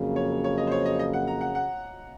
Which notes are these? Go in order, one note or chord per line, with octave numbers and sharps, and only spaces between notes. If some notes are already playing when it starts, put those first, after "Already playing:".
Already playing: F2 C#3 F#3 A#3
C#5
C#5
D#5
C5
C#5
D#5
D#5
F#5
A#5
F#5
F#5